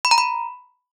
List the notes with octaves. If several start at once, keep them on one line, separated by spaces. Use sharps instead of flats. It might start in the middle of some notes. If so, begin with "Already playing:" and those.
B5
A#5
B5